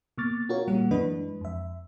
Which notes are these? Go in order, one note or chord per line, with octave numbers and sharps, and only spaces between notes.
B2 A#3 C#6 D6 F6 A6
F4 F#4 A#4 C#5
A#2 G3 A#3 F#5
F#2 E3 G#3 D4 B4 D#5
F2 E5